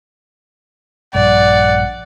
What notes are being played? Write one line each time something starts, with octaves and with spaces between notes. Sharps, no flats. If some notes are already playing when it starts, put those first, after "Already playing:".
A#1 G2 D5 F#5